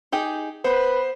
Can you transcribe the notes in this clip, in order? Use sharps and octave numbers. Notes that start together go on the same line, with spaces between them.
D#4 G4 G#4
B3 B4 C5